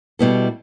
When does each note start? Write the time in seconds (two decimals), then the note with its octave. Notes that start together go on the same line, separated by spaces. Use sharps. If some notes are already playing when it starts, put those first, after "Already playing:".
0.19 B2 G3 B3 E4 A4